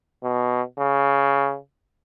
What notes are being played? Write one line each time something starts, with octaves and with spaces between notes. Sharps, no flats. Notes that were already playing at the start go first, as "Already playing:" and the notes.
B2
C#3